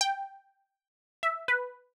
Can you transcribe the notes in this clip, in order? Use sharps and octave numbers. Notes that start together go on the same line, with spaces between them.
G5
E5
B4